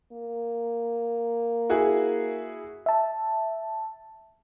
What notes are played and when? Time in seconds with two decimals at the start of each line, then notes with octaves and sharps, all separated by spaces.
0.12 A#3
1.70 E4 F#4 G#4
2.86 E5 A5